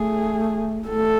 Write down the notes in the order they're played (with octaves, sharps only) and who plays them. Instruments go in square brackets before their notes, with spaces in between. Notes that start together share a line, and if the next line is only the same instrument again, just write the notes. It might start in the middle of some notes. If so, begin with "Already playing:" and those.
Already playing: [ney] A3 [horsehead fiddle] G#4
[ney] A3 [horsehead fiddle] A4